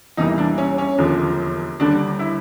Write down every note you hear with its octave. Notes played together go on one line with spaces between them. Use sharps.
E2 C3 E3 G3 A#3 D#4
D4
C#4
C#4
E1 D#2 D3 F3
D#2 D3 G3 D4
E4